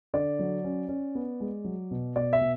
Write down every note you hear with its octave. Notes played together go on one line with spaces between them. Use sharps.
D3 D5
F#3
C#4
C#4
B3
G#3
F#3
B2
B2 D5
E5
B2